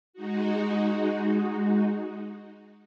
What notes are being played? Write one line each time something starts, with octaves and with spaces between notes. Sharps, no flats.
G#3 D#4 F#4